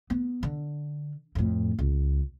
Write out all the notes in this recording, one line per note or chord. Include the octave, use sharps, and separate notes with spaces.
B3
D3
F2 A2
C#2